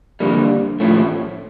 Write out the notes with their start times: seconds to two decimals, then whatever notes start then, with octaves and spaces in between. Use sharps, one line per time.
0.20 F2 D3 G3 A#3
0.80 A2 F3 A3 C#4